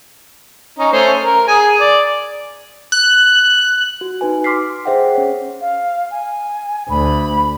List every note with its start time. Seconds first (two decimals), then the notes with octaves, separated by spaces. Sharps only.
0.78 C#4 D#4
0.92 A3 C#4 C5
1.24 A#4
1.48 G#4 G#5
1.80 D5
2.92 F#6
4.01 F#4
4.21 D#4 F#4 B4 G#5
4.44 C6 D6 F6 B6 C7
4.85 G#4 C5 E5 F#5 G5
5.15 C#4 C#5
5.60 F5
6.10 G#5
6.89 D2 B5